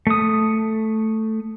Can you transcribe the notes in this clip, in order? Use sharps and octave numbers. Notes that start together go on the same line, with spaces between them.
A3 D#6